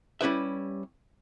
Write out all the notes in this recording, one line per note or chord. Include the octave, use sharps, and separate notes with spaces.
G3 C#4 E4 B4 E5